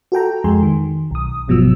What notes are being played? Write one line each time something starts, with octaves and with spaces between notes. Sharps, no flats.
F#4 A4 G5 A#5
F2 G#3 G#5 C6
D#3
B1 D#6
G1 G2 B2 F3 F#3 E6